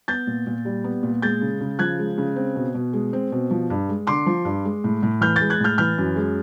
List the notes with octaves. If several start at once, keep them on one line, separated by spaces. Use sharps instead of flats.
B3 G6 A6
A#2
A#2
G3
B3
A#2
G#3 G6 A6
C#3
C#3
F3 F#6 G#6
G#3
C#3
C4
B2
B2
G#3
C4
B2
F3
G2
G#3
D3 C6 D6
F3
G2
G#3
A2
A2
E3 F6 G6
G6 A6
G#3
F#6 G#6
A2 F6 G6
E3 F6 G6
F#2
G#3